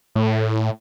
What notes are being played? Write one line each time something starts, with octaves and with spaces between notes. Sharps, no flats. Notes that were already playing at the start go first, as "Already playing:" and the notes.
A2